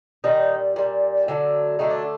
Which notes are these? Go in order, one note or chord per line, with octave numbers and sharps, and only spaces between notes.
A#2 D#3 G3 D#4
A#2 G3
D3 F#3 A3
D3 F#3 A3 D#4
D4